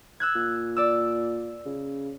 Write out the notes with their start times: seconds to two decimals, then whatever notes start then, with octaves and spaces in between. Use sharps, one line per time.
0.20 E6 F#6 G#6
0.35 A#2
0.76 D5 E6
1.66 C#3